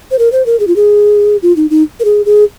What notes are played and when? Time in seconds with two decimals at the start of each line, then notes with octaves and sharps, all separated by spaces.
0.11 C5
0.19 A#4
0.32 C5
0.46 A#4
0.60 G#4
0.67 F4
0.76 G#4
1.42 F4
1.56 D#4
1.70 D#4
2.00 A#4
2.05 G#4
2.26 G#4